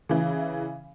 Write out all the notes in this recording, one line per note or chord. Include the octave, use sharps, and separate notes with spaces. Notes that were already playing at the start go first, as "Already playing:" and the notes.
C#3 E3